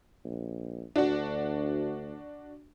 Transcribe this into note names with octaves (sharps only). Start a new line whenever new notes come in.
A#1
D2 D4 F#4